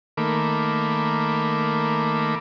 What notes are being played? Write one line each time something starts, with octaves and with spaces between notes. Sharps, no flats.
D#3 A3 A#3 B5 D6